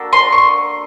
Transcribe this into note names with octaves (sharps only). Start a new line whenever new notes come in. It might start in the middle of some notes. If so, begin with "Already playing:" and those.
Already playing: A#3 D4 F#4 A4
C6
C#6